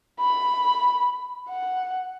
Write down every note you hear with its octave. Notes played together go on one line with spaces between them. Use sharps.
B5
F#5